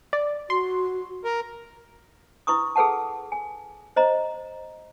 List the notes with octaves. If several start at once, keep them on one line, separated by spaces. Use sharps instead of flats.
D5
F#4 C6
A#4
E4 B4 C#6 D#6
G#4 A4 B4 F#5 A5
G#5
C5 D#5 A#5